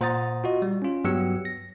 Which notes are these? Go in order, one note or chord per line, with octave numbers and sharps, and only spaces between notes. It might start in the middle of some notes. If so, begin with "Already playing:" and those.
A#2 C5 F#5 A#5 D#6 A6
F4 F#4 D#5
G3
C#4 F4
G2 F#3 B3 G4 E6 C#7
A#6